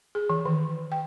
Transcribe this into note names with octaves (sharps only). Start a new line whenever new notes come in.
G#4
E3
D#3
G5